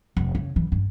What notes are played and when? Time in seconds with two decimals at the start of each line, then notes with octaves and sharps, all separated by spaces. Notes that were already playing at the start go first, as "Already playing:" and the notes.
0.17 F1
0.35 C#3
0.56 E3
0.72 G2